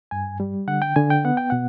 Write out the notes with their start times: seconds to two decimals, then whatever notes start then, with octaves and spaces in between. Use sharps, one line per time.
0.11 G2 G#5
0.40 G3
0.68 D3 F#5
0.82 G5
0.96 D3 G#5
1.10 G5
1.25 B3 F#5
1.37 G5
1.50 B2 F#5